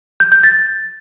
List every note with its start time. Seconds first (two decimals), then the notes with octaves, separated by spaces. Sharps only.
0.20 G6
0.32 G6
0.43 A6